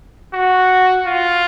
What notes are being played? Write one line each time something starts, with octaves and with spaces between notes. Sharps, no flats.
F#4
F4